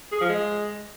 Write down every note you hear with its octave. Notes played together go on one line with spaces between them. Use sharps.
G#4
F3
G#3